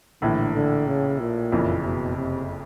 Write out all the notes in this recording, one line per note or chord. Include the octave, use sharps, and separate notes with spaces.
A#1 A2 D3 E3
D3
C#3
A#2
F#1 F2 C#3 E3
B2
C3